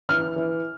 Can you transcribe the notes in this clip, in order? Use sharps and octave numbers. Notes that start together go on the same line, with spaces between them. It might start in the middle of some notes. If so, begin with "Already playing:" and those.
E3 F6
E3